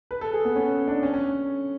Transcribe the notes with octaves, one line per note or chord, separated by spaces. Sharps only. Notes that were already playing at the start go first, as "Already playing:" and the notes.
B4
A4
G#4
B3
C#4
D4
C#4
C#4